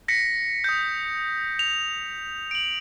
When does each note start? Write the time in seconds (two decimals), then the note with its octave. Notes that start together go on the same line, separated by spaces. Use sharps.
0.08 A#6 B6 C#7
0.64 D#6 G6
1.59 F7
2.51 D7 F#7